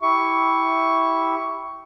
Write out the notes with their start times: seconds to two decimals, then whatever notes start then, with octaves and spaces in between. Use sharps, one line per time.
0.02 E4 G4 E5 C#6